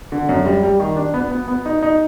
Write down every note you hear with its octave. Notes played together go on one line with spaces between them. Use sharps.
D3
F#2
G3
G3
D#3
D4
B3
B3
B3
D#4
D#4